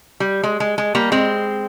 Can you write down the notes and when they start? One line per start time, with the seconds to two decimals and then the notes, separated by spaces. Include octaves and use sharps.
0.20 G3
0.43 G#3
0.60 G#3
0.78 G#3
0.95 G3 A#3
1.12 G#3 C4